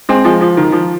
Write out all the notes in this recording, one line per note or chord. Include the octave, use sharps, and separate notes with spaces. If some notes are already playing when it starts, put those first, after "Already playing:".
G#3 C4
F3 G#3
F3
D#3
F3